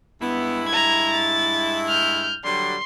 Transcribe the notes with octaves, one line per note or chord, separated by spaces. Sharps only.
G2 G#3 B3 E4
A#5 G#6
A6
F6 G6
D3 F#3 G3 C6